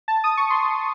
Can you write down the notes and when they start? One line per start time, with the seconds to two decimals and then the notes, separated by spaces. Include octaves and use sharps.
0.08 A5
0.24 D#6
0.37 C#6
0.50 C6